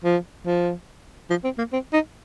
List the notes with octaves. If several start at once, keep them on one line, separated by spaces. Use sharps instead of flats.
F3
F3
F3
C4
A#3
C4
D#4